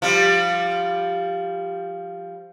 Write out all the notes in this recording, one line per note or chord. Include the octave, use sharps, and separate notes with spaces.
F3 G3